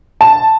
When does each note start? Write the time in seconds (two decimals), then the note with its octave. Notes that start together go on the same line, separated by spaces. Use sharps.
0.21 A5